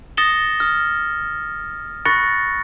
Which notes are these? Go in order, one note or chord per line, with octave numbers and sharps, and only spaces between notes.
D#6 A6 A#6 C#7 E7 G7
D#6 F6
B5 C#6 F#6 A6 A#6 C#7